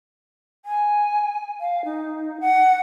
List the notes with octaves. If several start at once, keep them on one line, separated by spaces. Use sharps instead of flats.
G#5
F5
D#4
F#5